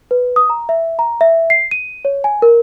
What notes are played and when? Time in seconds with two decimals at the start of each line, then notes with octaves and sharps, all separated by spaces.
0.11 B4
0.36 D#6
0.50 A#5
0.69 E5
0.99 A#5
1.21 E5
1.50 C7
1.71 D#7
2.05 C#5
2.24 G#5
2.42 A#4